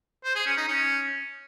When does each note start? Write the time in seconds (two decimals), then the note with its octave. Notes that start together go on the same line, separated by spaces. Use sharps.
0.24 C5
0.35 G#4
0.46 C#4
0.57 D#4
0.68 C#4